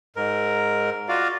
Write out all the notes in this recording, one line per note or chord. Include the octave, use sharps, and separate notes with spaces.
G#2 A#4
F4 F#4 D5 F5